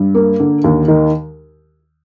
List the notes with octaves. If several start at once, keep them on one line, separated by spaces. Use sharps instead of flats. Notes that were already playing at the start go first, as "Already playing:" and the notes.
Already playing: G2
A#3
D3
D#2
D#3